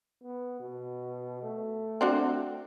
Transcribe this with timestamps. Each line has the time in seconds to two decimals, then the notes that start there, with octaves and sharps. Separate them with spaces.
0.23 B3
0.60 B2
1.43 A3
2.01 C4 D4 F#4